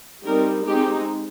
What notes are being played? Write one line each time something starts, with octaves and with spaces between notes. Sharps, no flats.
G3 C4 D#4 A#4
G#3 C4 D#4 G4